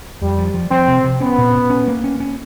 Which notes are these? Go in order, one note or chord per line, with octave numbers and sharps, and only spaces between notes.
F2 G3
F3
F3
F3 C4
C3
C3
B3 C#4
A#2
A#2
C#4
A#3
C#4
C#4